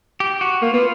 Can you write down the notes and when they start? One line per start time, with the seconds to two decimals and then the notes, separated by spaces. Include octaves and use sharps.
0.20 G4
0.41 F#4
0.62 A#3 F4
0.73 B3